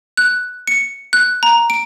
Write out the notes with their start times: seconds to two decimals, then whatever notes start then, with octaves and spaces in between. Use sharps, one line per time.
0.17 F#6
0.67 C#7
1.13 F#6
1.43 A#5
1.70 D7